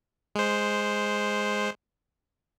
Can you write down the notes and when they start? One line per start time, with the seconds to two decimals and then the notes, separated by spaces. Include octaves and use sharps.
0.35 G#3 C5